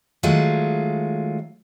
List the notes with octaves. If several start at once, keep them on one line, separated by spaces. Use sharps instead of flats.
D#3 F#3 G#3 A3 F4